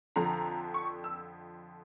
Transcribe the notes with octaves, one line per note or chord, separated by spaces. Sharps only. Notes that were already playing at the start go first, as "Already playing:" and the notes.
F2 D3 F3 A#5
C#6
E6